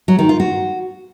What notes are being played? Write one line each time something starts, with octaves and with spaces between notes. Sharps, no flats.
F#3
D#3
F4
F#4